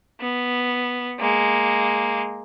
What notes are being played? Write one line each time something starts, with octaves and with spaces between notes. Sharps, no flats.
B3
G#3 A#3